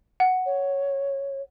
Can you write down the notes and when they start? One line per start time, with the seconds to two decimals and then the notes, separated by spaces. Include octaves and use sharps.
0.20 F#5
0.45 C#5